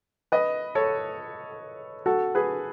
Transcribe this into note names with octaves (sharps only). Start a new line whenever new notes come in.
B4 D#5
A4 C#5
F#4 A4
G#4 B4